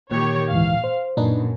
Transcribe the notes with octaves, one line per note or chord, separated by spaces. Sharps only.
A#2 D#3 G4 C#5
D2 G#2 E3 F5
C5
F#2 A#2 D4 D#4 B4